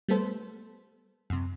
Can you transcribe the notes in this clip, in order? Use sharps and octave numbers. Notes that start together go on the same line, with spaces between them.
G3 A3 B3 A4 C5
F#2 C3